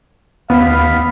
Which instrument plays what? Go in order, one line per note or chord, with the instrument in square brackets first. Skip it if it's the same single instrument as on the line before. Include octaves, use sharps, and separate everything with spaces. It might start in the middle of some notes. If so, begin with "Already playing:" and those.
[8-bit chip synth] D#2 B6 [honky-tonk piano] B3 [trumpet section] F5